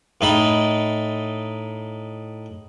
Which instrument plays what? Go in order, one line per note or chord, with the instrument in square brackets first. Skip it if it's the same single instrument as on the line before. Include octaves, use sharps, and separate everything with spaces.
[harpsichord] A2 D#4 B5